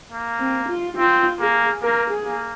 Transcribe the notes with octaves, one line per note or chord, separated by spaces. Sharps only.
A#3
C4
F4
C4 F4
A#3 G#4
A#3 A#4
G#4
A#3